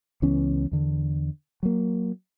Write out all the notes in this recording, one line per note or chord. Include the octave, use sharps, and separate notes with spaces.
C#2 E3 B3 C#4
E2 D3
F#3 A#3